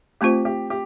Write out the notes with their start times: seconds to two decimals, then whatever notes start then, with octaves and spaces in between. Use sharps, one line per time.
0.21 A3 C4 F4 G4 C5
0.45 G4
0.70 G4